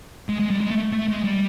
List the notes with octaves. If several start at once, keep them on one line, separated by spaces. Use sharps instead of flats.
G#3
G#3
G3
G#3
A3
A3
G#3
G3